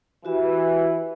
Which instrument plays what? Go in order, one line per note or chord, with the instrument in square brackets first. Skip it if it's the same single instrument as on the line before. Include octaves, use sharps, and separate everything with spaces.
[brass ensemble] E3 [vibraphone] F#4 G4 E5